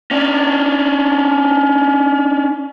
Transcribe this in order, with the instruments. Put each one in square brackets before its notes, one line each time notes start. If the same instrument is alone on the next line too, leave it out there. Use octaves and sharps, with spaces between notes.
[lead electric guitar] C#4 D4